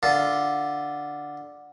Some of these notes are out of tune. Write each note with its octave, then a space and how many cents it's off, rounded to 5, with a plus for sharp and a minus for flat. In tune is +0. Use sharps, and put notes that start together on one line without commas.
D3 +0 F4 +0